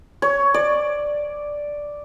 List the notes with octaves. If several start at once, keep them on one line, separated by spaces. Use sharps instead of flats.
C#5
D5